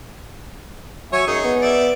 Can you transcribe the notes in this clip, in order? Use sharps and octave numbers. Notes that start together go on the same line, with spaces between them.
F#3 C#5 E5 G#5
F#2 D#4 G#4
B3
D5 E5